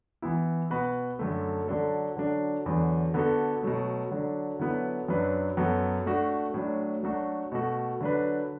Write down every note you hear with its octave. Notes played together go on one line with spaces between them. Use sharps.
E3 B3 E4
B2 B3 F#4 B4
F#2 D3 A3
D3 F#3 D4 A4
D3 F#3 D4
E2 D3 F#3 D4
D3 B3 F#4 A4
B2 F#3 A3
D3 F#3 D4
D3 F#3 B3 E4 B4
F#2 F#3 D4 B4
F#2 F#3 B3 F#4 A4
A2 A3 D4 F#4
A2 F#3 D4
F#3 A3 D4 F#4 A4
B2 A3 F#4
D3 F#3 D4 B4